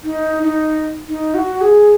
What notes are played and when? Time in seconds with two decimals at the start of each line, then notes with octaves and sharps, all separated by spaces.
0.04 D#4
0.43 D#4
1.08 D#4
1.34 F#4
1.61 G#4